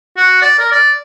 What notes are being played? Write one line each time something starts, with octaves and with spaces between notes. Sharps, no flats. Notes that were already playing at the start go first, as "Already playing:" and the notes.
F#4
D5
A#4
D5